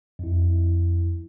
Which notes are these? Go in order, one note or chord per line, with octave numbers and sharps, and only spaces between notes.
F2 E4